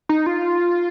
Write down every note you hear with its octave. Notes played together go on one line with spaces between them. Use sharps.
D#4
F4